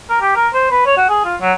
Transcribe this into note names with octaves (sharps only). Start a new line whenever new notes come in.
A#4
G4
A#4
C5
B4
C#5
F#4
G#4
F4
F#3